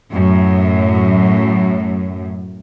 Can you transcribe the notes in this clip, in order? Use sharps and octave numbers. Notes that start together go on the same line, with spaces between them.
F#2 A2